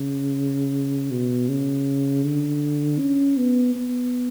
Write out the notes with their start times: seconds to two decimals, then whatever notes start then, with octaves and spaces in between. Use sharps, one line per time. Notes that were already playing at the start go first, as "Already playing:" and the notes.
Already playing: C#3
1.11 B2
1.49 C#3
2.24 D3
2.99 C#4
3.37 B3
3.75 B3